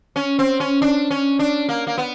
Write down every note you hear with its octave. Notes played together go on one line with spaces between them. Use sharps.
C#4
C4
C#4
D4
C#4
D4
A#3
A#3
B3